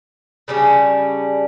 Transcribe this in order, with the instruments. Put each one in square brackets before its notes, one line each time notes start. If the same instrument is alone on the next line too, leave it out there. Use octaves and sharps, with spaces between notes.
[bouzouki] C#3 G3 C#4 D4